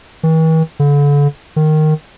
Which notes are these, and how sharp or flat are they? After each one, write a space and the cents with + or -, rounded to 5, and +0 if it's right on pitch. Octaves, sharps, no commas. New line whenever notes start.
E3 -45
D3 -35
D#3 -10